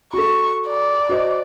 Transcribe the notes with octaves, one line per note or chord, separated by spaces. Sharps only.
F#4 A4 C#6
D5
F#4 C5 D#5